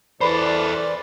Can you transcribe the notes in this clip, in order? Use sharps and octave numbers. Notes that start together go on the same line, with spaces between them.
E3 G#4 A4 B4 C5 D5 B5